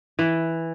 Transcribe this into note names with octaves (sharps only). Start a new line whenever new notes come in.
E3